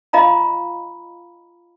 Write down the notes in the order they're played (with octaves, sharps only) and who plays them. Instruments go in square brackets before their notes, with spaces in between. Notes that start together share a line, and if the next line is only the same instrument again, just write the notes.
[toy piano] F4 D#5 F5 A#5 B5